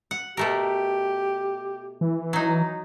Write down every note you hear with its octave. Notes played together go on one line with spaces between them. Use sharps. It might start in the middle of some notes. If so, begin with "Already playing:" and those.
F#5
B2 A3 G4 A#4
E3
F#3 D#4